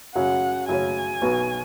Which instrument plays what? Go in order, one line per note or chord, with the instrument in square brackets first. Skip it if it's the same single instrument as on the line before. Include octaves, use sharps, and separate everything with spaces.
[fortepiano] F#2 C#3 F#3 C#4 [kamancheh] F#5
[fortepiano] F#2 C#3 F#3 C#4 [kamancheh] G#5
[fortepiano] B1 B2 F#3 B3 F#4